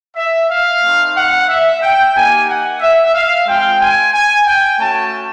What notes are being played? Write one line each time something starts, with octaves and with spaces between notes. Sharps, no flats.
E5
F5
A3 C4 D#4
F#5
E5
G5
A#3 D#4 G4 G#5
F#5
E5
F5
G#3 C4 F4 G5
G#5
G#5
G5
A3 C#4 F#4 A5